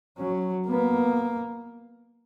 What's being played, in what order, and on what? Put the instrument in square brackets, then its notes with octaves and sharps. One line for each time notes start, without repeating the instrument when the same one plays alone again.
[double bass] F#3 [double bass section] C#4
[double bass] A#3 [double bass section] B3